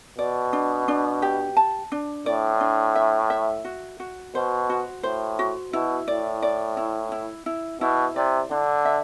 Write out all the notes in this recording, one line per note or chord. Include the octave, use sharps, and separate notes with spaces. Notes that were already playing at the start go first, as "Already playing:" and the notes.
B2 D5
D4
D4
G4
A5
D4
A2 D5
D4
E5
E5
F#4
F#4
B2 C5
F#4
A2 C5
F#4
B2 E4
A2 D5
D5
E4
E4
E4
B2 E4
C3 D5
D3 D4
E5